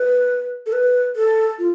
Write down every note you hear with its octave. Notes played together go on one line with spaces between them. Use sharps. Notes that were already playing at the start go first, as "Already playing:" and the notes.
Already playing: B4
A4
B4
A4
F4